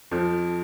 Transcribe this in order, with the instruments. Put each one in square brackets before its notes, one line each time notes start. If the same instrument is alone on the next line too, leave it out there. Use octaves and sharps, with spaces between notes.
[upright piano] F2 F3